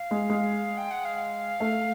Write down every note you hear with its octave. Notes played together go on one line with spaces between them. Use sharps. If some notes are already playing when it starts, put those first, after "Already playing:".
Already playing: F5
G#3
G#3
G5
F#5
F5
A3